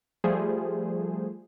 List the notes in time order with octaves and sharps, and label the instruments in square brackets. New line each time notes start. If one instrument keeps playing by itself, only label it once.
[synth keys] F3 G3 A3 G#4 C5